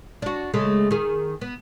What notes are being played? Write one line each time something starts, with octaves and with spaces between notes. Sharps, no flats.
D4 F#4
C#3 G#3 A3
D#3 G#4
B3